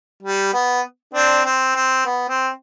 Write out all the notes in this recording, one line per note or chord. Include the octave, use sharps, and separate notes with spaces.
G3
B3
C4 D4
C4
C4
B3
C4